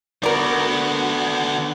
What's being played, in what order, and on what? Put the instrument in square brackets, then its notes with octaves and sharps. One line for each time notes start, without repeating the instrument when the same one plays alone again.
[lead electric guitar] D3 F#4 [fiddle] B3 [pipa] A#4 D5